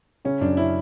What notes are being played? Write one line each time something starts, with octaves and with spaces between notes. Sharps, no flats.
C#3 C#4
F#2 D4
C#4 E4